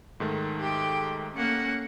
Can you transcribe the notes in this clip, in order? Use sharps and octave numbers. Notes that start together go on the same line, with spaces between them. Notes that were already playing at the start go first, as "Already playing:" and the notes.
G#2 D#3 A3
G4 G5
A3 A#3 C#4 F#5